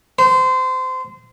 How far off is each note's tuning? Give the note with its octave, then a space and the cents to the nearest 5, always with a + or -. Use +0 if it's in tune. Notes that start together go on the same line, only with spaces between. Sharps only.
C5 -25